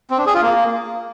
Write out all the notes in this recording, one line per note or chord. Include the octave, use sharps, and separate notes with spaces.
C4
D4
G#4
F4
A#3